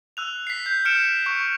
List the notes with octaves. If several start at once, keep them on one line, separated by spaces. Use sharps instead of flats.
E6 F#6 F7
B6 C7
G6
F6 C#7 D7 E7
C#6